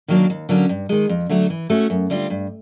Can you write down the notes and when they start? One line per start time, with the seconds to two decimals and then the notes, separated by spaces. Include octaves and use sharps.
0.08 D#3 F#3 A#3 D4
0.30 D#2
0.49 D3 F#3 A#3 C#4
0.69 G2
0.89 D#3 G#3
1.09 F2
1.29 D3 F#3 A3
1.50 E3
1.70 A3 C#4 F#4
1.90 F#2
2.10 D3 G3 C4 F4
2.30 G2